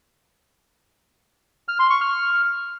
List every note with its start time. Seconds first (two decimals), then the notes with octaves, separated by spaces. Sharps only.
1.68 F6
1.79 C6
1.90 C#6
2.01 F6